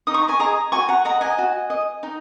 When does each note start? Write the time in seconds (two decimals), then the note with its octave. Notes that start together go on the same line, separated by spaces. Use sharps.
0.07 D#4 D#6
0.14 C#6
0.22 A#5
0.28 G#5 C#6
0.39 G#4 D#5 A#5 D#6
0.72 F#4 G#5 C#6
0.89 F#5 A#5
1.05 D#5 F#5 A#5
1.21 D#5 G#5
1.38 F#4
1.70 D#5
2.03 D#4